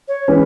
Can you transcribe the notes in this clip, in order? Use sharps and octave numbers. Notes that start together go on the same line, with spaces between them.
C#5
E3 G#3 C#4 B4